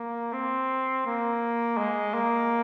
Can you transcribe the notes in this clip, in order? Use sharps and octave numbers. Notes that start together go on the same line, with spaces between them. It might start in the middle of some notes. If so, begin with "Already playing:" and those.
Already playing: A#3
C4
A#3
G#3
A#3